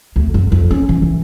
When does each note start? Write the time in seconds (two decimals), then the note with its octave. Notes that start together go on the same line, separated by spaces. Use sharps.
0.16 D2
0.34 F#2
0.52 F2
0.71 C#4
0.89 E3
1.02 E3